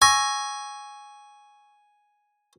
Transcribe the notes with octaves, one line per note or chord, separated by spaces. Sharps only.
G#5 C#6 E6 A#6